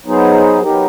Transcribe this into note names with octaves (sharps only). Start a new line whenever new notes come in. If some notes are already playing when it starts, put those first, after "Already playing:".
F#3 B3 D#4 G#4 C5
F#3 B3 D#4 G4 A#4